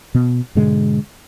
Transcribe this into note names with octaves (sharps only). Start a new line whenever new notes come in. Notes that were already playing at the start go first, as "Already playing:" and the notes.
B2 B3
G#2 B2 D3 G#3